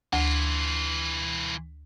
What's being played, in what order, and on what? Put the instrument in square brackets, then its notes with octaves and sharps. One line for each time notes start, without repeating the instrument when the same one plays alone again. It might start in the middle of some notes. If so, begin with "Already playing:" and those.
[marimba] D2 [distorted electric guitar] E3 F4